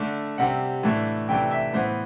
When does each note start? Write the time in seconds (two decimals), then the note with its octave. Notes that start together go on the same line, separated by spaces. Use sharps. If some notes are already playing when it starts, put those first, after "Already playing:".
Already playing: D3 A3 D4
0.38 C3 G3 C4 F#5
0.83 A2 E3 A3 D4
1.28 C3 E3 A3 D4 G5
1.51 E5
1.73 A2 E3 B3 C5